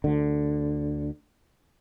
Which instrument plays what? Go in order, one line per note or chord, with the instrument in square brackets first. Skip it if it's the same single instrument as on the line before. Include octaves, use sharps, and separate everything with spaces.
[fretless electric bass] D2 D3